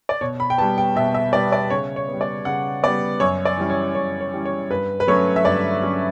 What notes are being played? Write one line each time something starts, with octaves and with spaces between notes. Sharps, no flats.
D5
B2 C#5
B5
G5
G3 B3 A5
G5
B2 E5
E5
G3 B3 D5
D5
C#3 C#5
C#5
B3
G3
D5
C#3 F#5
G3 B3 D5
F#2 C#5
D5
E3 G3 C#4
C#5
F#2 C#5
C#5
E3 G3 C#4
C#5
G2 B4
B4
F#3 A3 C#4 C#5
E5
G2 D5
F#3 A3 C#4